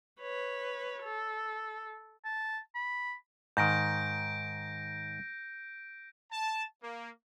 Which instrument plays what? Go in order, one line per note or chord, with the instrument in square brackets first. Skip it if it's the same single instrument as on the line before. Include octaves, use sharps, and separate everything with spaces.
[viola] B4 C#5
A4
[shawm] A5
B5
[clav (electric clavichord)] G#2 D#3 [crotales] G6 A#6 D7
[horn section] A5
A#3